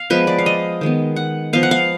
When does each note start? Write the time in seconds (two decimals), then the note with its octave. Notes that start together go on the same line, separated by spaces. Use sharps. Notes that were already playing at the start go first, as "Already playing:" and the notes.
Already playing: F5
0.10 F3 G#3 B3 B4
0.27 D5
0.38 F5
0.46 D#5
0.81 D#3 G#3 B3
1.16 F#5
1.53 F3 B3 F5
1.63 F#5
1.71 F5